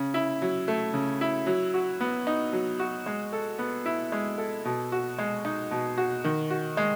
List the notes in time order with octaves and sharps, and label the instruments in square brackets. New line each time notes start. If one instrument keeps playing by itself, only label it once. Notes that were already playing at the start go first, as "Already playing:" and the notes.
Already playing: [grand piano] C#3
E4
F#3
A3
C#3
E4
F#3
F#4
B3
D#4
F#3
F#4
G#3
A4
B3
E4
G#3
A4
B2
F#4
G#3
D#4
B2
F#4
D#3
F#4
G#3